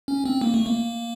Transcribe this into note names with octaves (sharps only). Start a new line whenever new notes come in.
C#4
C4
A#3
A3
A#3